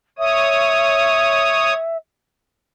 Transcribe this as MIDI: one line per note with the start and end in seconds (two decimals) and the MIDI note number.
0.19 1.74 73
0.19 1.97 76
0.19 1.74 87